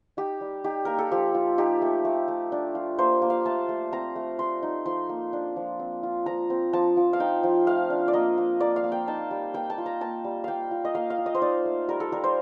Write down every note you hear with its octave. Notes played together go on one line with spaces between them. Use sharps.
D#4 G4
G3
D#4 G4
A#3 A#4
A4
F3 G4
F4
D#4 G4
A3
A3
A3
D4
F4
A#3 C5
A#3
F5
A3 A5
A3
C4 A#5
A3
A3 C6
D#4
F3 C6
A#3
D4
F3
C4
F4
F3 A#5
C4
F3 A5
F3
F5
D#4 G5
F3
A3 F5
D4
D5
A#3 D#5
A#3
A#3 D5
F5
A#3
G5
D#4 A5
G3
A#3 G5
A5
F4
A#5
A#3 A5
G3
A#3 F5 G5
F4
D#5
A#3 F5
F5
F4
D#5
C5
D#4 D5
A3
G3 A#4
A4
G3 A#4
C5